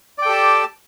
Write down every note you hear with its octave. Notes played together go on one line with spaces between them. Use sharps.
G4 A4 D5 G5 A5